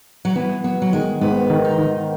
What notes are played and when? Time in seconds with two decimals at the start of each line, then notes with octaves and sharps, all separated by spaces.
0.25 F#3
0.35 E3 B3
0.64 F#3 B3
0.82 F#3
0.92 D#3 G#3
1.21 G#2 B3
1.50 D#3
1.65 D#4
1.79 D#3